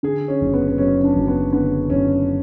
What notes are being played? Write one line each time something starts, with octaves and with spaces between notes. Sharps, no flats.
D3 G#4
C#4
F#1
B3
B3
F#2 C#4
D4
F#1
B3
D3 B3
F#1 C#4